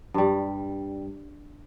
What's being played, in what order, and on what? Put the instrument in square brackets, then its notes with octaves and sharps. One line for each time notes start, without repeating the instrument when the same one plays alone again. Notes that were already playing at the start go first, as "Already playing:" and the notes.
[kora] G2 G3